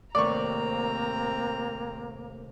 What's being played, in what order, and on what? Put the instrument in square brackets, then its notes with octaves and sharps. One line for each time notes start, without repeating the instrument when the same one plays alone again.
[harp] D#2 A2 C3 [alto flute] A#3 [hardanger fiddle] C4 A#5 [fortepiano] D5 C#6